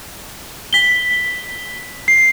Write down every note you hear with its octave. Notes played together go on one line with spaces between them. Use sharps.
B6 G7
C7